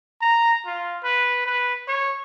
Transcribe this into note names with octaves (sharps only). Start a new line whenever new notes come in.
A#5
F4
B4
B4
C#5